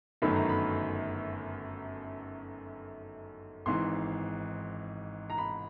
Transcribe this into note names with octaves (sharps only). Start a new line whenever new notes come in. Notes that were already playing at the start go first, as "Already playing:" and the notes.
G1 F#2 D#3 F#3 A3 B5
A#5
B5
G#1 G#2 E3 C6
A#5
B5